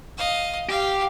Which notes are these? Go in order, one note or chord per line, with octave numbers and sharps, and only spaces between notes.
D#5 F5
G4 F5